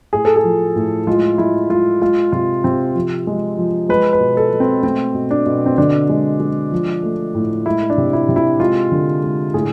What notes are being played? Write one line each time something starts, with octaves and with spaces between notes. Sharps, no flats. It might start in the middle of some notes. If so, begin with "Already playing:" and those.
A2 G#4
A4
G#4
F3
A2
G#3 F4
G#3 E4
G#3 F4
G#3 F4
C3 F4
C3 C4
F3
G#3
F3
G#3 B4
B4
B2
A4
G#3
C4
A3 C4
B2
D4
B2
C4
D3 D4
G#3
G#3
F3
A3
A2
G#3 E4
D4
C3
E4
C3
E4
G#3 F4
D3
G#3
A2 G#4